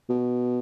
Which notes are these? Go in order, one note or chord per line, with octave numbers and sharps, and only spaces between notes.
B2